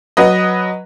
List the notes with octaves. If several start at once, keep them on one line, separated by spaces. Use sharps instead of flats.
F#3 B4 D#5